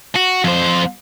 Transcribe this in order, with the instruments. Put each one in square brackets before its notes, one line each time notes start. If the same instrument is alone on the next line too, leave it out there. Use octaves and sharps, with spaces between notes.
[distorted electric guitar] F#4
F2 C5